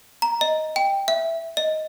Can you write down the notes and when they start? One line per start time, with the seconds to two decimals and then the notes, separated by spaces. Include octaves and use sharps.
0.22 A#5
0.41 D#5
0.76 G5
1.08 E5
1.57 D#5